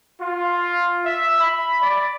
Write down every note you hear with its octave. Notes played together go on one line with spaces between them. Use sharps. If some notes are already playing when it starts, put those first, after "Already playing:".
F4
E5
B5
D5